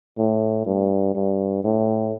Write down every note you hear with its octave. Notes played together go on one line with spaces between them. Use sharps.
A2
G2
G2
A2